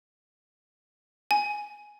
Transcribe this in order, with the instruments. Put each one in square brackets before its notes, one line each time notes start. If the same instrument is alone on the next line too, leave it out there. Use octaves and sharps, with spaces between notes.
[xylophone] G#5